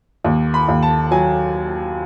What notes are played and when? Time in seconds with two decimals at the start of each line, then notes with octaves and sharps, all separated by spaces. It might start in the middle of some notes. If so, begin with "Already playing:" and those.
0.24 D#2
0.54 B5
0.68 D#2
0.83 A5
1.11 F#3 G#5